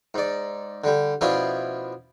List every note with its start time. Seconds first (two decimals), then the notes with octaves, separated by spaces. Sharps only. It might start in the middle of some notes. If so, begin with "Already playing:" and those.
0.14 G#2 D5
0.84 D3 G3
1.21 B2 F3 C#4 E4 G#4 D5